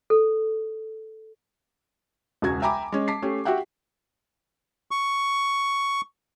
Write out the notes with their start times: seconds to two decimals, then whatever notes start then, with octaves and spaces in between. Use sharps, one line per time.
0.10 A4
2.42 E1 C#2 F#4 G#6
2.62 E5 G5 G#5 A#5 B5 D6
2.92 G#3 C#4
3.08 A5 D6 B6 C7
3.22 A3 C#4 G4
3.45 F#4 G4 E5 F#5 G5
4.91 C#6